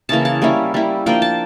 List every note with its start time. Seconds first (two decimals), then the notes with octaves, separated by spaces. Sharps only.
0.09 C#3 E3 A#3 A5
0.25 A5
0.42 G3 A#3 C#4 E4
0.74 G3 A#3 E4
1.06 F3 A#3 D4 G5
1.22 A5